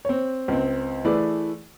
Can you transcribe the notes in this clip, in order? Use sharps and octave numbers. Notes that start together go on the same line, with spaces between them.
C4 C#5
C#2 C4
E3 A3 E4 G#4 B4 D5